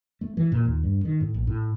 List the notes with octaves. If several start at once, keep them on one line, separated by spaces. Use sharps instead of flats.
A3
E3
A#2
D#2
G2
D#3
A2
A#1
A2